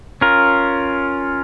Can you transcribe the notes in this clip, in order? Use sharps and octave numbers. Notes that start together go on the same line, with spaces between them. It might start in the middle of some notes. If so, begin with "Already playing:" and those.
C#4 F4 A#4